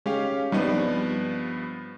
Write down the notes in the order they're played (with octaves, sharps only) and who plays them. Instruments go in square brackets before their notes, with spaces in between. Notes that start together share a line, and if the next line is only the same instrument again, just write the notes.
[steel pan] G#3 [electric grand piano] C#4 G4 F5
[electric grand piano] G2 F3 B3 [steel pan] G3 C4 D#4